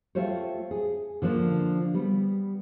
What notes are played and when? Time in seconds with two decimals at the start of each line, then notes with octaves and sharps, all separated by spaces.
0.15 A3 F4 G4 C5 C#5
0.71 G#4
1.22 D3 F3 A#3 D4
1.94 G3 B3